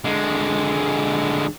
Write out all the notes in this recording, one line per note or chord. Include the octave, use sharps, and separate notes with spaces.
D3 G#3